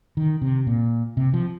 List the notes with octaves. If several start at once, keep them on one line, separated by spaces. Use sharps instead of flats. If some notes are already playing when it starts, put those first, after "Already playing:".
D#3
C3
A#2
C3
F3